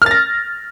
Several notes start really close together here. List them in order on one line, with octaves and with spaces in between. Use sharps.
F6 A6 A#6